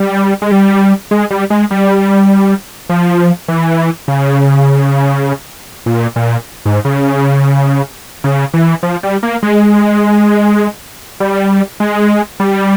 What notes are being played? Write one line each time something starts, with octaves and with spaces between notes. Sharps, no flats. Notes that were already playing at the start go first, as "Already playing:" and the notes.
Already playing: G3
G#3
G3
G#3
G3
G#3
G3
F3
E3
C#3
A#2
A#2
G#2
C#3
C#3
E3
F3
G3
A#3
G#3
G3
G#3
G3